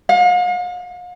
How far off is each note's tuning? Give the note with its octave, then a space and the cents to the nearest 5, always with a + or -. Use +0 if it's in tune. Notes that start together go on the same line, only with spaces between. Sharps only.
F5 +45